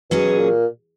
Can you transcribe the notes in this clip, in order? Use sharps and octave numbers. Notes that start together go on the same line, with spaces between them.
B2 F#3 C#4 G#4
A#2